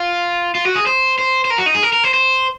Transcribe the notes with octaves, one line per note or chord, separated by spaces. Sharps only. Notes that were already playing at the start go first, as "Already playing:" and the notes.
Already playing: F4
F4
F#4
G#4
C5
C5
C5
A#4
F#4
D#4
G#4
A#4
A#4
C5
C5